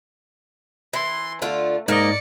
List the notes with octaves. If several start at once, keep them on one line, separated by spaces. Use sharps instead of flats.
E3 C6
D3 A3 F4
G#2 A#3 D5 D#5 F5 C#7